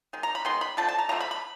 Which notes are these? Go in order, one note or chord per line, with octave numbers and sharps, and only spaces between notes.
D#3 G#3
A#5
B5
D#3 G#3 B3 C6
B5
D3 F3 A3 A5
A5
A#5
D3 F3 A3 A#5
B5
B5